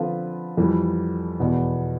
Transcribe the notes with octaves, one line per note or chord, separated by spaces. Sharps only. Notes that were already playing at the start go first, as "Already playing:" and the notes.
Already playing: D3 F3 C4 F4 B4
F2 E3 G3
E2 B2 B3